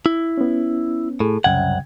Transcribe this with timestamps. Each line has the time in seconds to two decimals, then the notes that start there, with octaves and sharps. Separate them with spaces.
0.06 E4
0.38 B3 C#4
1.20 A2 G#4 A4
1.44 C2 F#2 C#3 F#5 G5 G#6